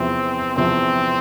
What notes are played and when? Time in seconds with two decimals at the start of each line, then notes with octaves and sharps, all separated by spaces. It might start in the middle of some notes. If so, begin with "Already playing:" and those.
Already playing: E2 C3 F3 C4
0.56 E2 C3 F3 C4